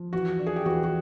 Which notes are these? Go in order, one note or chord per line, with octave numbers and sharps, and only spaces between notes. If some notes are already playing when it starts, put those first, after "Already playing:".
Already playing: F3
E3 F#4
D4
G#4
G4
E3 F#4
F#4